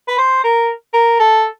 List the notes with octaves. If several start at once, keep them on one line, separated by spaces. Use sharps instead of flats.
B4
C5
A#4
A#4
A4